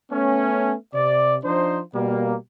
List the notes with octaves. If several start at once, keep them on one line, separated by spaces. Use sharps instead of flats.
A3 B3 C#4
C3 D5
F3 D4 D#4 C5
B2 G3 A#3